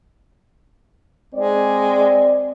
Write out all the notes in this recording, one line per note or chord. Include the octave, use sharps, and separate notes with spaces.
G#3 C4 D5